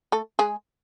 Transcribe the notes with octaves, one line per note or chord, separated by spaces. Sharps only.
A3 A4
G#3 G#4